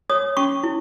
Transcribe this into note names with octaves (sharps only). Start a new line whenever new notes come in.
C#5 D#6
C#4 C#6
E4